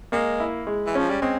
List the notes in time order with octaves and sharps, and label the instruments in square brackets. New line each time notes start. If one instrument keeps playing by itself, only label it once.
[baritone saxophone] G#3 [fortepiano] A#3
[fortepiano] E4
G#3
[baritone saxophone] E3
[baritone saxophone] F3 [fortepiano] C#4
[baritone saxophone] G3
[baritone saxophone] G#3 [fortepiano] C4